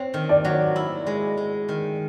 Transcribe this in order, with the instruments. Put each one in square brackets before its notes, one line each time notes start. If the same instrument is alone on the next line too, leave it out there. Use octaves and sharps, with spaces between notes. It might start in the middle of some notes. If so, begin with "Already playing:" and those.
Already playing: [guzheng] C4 [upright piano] C#5
[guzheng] D#3
[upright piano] D5
[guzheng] F#3
E4
G#3
G#3
D#3